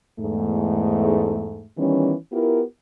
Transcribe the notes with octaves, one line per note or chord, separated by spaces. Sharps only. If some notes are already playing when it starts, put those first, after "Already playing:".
E2 G#2 A3
D#3 E3 G3 B3 C#4
B3 E4 F4 G4 A#4